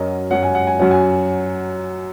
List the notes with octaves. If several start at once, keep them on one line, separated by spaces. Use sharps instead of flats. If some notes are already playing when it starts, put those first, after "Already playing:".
Already playing: F#2 F#3 C#4 A#4 D#5
F#2 F#3 C#4 F#5
G#5
F#5
G#5
F#2 F#3 C#4 F#5
G#5